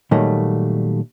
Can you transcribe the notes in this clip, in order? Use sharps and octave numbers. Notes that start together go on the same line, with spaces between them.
A#2 D#3 F#3 G3 A3